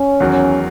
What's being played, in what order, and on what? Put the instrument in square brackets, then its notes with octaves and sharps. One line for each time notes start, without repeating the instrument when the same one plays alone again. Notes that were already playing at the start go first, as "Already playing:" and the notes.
Already playing: [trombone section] C#4
[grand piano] E2 D#3 F#3